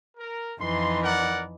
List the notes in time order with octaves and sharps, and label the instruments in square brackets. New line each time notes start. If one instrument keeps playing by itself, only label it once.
[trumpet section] A#4
[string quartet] F2 E3 D#4 [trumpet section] C6
[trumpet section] A#4 D5 F#5